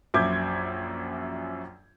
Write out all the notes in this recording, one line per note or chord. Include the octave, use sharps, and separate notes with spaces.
A#1 F#2 E5 D6 G6 G#6